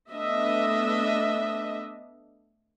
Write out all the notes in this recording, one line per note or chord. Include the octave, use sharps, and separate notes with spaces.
A3 B3 D4 D#5 E5